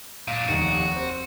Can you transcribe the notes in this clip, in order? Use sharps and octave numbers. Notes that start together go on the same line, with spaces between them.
A#2 D4 F5
F1 D#2 F#4
C4